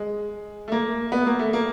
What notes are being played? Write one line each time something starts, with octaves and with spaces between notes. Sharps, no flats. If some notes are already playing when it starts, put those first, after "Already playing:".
Already playing: G#3
A3
A#3
B3
A#3
A3
A#3